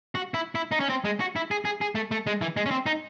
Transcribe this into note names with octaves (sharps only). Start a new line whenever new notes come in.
F#4
E4
E4
D#4
C#4
C4
G#3
F#4
E4
G#4
G#4
G#4
A3
A3
G#3
E3
G#3
C#4
C4
D#4